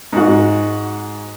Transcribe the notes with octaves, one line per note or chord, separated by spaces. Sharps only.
G#2 F#4